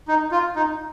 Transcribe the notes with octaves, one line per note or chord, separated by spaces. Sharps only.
D#4
F4
D#4